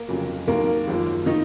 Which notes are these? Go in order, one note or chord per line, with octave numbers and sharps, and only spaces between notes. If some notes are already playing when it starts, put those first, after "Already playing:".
Already playing: A#3 A#4
F1 F2 C#3 F#3
D#2 D#3 F#3 A#3 A#4
G#1 F#2 F3
D#3 D#4